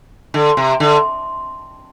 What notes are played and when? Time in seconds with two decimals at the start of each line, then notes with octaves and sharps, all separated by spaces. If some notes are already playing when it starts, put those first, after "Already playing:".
0.34 D3
0.57 C3
0.80 D3